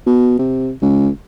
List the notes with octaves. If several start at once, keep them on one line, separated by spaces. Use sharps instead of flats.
B2
C3
C#2